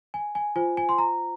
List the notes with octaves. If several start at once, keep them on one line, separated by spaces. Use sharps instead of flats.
G#5
G#5
F4 C5 G#5
G#5
C6
A#5